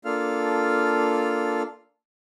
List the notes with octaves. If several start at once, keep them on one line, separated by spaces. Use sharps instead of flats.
A#3 D4 F4 A4 F5 F6